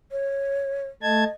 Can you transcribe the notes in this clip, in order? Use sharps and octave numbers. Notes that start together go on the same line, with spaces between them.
C#5
A3 D#5 A5 G#6